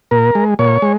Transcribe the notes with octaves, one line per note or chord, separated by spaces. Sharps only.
A#2 A#4
G#3
A#2 C#5
G#3